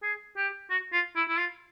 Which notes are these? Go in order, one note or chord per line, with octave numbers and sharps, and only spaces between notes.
G#4
G4
F#4
F4
E4
E4
F4